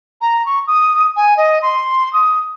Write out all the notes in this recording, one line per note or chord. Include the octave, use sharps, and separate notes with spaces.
A#5
C#6
D#6
G#5
D#5
C6
D#6